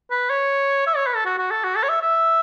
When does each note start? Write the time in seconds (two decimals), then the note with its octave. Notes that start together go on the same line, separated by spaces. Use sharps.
0.11 B4
0.30 C#5
0.87 E5
0.96 C#5
1.06 B4
1.15 A4
1.26 F#4
1.38 F#4
1.51 A4
1.64 F#4
1.76 A4
1.83 C#5
1.89 E5
2.02 E5